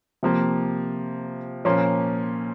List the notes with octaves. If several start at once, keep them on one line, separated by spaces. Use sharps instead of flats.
C3 F3 A#3
A#2 F3 A#3 C#4